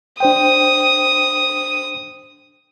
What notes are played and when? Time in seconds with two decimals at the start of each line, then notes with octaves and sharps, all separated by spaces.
0.20 D4 C5 G5 D#6